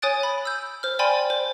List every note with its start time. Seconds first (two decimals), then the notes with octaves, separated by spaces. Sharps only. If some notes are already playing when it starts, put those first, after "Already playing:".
0.02 C#5 G#5 D#6 F#6 A6 D7
0.23 B5
0.45 E6 G6
0.83 C5 F6
0.99 C5 D5 G5 G#5 B5 C6
1.30 C5